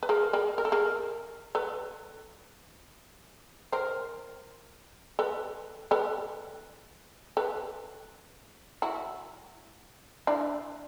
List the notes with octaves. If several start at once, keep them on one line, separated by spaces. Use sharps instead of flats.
B4
G#4 A#4
G#4 A#4
A#4
A4
G#4 A#4
A4 B4
A#4 C5
A4 B4
A4 B4
A4 B4
E4 F#4
D4 E4